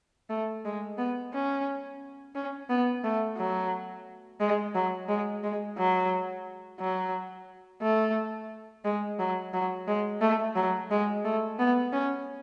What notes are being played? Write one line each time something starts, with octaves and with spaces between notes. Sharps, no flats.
A3
G#3
B3
C#4
C#4
B3
A3
F#3
G#3
F#3
G#3
G#3
F#3
F#3
A3
G#3
F#3
F#3
G#3
A3
F#3
G#3
A3
B3
C#4